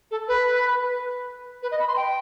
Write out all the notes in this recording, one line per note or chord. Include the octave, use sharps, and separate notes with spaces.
A4
B4
B4
D#5
B5
C6
G5